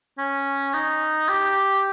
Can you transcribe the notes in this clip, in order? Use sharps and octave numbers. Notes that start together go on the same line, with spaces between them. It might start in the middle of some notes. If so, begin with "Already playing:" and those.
C#4
D#4
G4